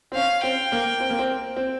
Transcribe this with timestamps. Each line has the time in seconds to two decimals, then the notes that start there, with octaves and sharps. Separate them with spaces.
0.12 C4
0.15 C#4 F5
0.43 C4 G5
0.72 A#3
1.00 C4
1.10 A#3
1.19 C4
1.56 C4